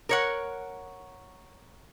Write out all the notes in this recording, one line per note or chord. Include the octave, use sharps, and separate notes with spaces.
A#4 C#5 F#5